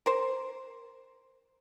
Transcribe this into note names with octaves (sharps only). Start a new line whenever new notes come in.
A#4 C5